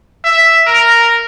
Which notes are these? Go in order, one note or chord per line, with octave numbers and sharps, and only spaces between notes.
E5
A#4